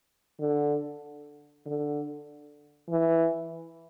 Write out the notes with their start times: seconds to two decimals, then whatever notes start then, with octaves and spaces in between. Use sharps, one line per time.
0.40 D3
1.65 D3
2.89 E3